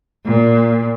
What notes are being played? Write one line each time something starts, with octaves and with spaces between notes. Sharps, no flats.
A#2